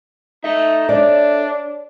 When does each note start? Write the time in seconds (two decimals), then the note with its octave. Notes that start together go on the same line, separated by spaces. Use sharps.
0.44 D#4 A4 E5
0.89 D4 C#5 D5